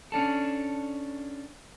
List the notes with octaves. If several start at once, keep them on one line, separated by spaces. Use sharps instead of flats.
C#4 D4 A4